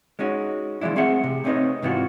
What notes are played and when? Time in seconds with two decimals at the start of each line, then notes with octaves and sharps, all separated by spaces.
0.19 G#3 C#4 D#4 F#4
0.81 E3 F3 G#3 D4 E4
0.96 A3 C4 G#4 C5 E5 F#5
1.24 C3
1.44 A3 C4 C#4 D#4 B4 D#5
1.82 G#2 C3 E3 F4 F#4